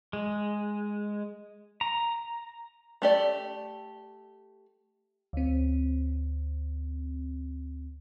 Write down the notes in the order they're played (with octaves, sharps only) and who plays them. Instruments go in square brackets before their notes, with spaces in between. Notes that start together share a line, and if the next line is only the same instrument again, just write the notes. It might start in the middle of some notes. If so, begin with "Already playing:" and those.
[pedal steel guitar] G#3
A#5
[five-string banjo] A3 G4 D5
[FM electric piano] D2 C4